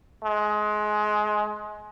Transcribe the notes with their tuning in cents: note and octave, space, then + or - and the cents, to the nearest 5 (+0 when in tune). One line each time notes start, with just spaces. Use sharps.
G#3 +25